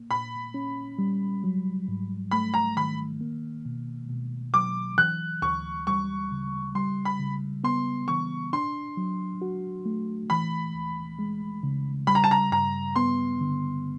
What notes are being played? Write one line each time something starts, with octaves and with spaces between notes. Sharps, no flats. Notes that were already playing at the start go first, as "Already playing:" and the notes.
Already playing: A#3
A#2 B5
C#4
G3
F#3
G#2
A3 B5
A#5
D#3 B5
A#3
B2
B2
F#3 D6
E3 F#6
D2 C#6
G3 C#6
C#3
G3 C6
B5
C#3
B3 C6
E3 C#6
D4 C6
F#3
F#4
A3
E3 B5
D2
G#3
C#3
G3 B5
A#5
A5
A#5
G2 A#5
B3 C6
D3